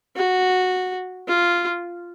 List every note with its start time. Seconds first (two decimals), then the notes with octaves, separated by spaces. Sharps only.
0.16 F#4
1.28 F4